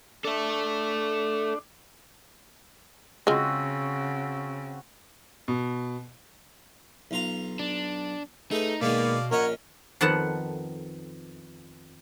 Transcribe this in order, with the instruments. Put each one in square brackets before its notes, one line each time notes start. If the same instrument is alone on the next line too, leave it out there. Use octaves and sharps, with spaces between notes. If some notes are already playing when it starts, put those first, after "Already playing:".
[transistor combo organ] D4 [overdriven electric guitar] A4 E5
[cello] C#3 [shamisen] G#3 F4 [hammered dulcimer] C4 F#4
[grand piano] B2
[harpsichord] B1 F4 A#5
[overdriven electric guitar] D4
[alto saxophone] A3 [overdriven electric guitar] D#4 [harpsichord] G#4 B4
[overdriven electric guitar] B2 [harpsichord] D#3 G#3 B3 [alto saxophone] A#3 [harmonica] D5 F5
[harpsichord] A#1 C#4 D#5 [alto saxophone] A#4 [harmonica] C#5 F#5 A#5
[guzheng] F2 D#3 B3 A4 F#5 A5